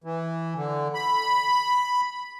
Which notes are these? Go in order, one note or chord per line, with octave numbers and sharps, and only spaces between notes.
E3
D3
B5